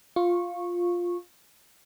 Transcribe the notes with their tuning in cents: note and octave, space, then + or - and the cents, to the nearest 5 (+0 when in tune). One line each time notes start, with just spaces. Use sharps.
F4 +5 C#6 -15